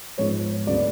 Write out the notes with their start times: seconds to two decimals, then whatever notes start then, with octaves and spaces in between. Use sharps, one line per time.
0.18 G#2 F3 G#3 B3 C#5
0.67 D2 C#3 F#3 B3 D5